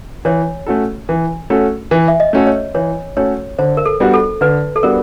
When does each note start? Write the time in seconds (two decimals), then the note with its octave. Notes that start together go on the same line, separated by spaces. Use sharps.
0.25 E3 C#5
0.66 A3 C#4 F#4 A4
1.09 E3
1.50 A3 C#4 F#4 A4
1.91 E3
2.08 E5
2.20 D#5
2.33 A3 C#4 F#4 A4
2.47 C#5
2.75 E3 C#5
3.17 A3 C#4 F#4 A4 C#5
3.59 D3 C5
3.77 A#4
3.85 A4
4.00 G3 B3 D4 F#4
4.14 A4
4.41 D3 B4
4.76 A4
4.83 G3 B3 D4 F#4 A#4